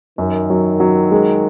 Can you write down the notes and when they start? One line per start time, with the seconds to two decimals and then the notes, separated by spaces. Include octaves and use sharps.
0.18 F#2 D#3
0.50 F#3
0.80 F#3
1.11 G#3